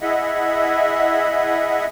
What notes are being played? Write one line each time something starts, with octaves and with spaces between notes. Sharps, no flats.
E4 G#4 D#5 E5 F#5